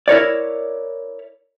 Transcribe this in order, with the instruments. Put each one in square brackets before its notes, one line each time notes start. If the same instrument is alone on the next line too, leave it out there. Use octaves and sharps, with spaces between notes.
[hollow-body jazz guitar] E4 A#4 C#5 D5